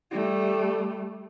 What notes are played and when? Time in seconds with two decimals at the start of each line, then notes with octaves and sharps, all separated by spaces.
0.11 G3 A3